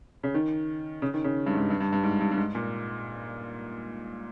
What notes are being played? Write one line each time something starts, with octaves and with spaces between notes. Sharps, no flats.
C#3
D#3
C#3
D#3
C#3
G2
G#2
G2
G2
G2
G2
G#2
G2
G2
G#2
A#2